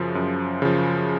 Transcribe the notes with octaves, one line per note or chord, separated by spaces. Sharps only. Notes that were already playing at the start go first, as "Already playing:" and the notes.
Already playing: F#2 C#3 F3
F#2
C#3 F3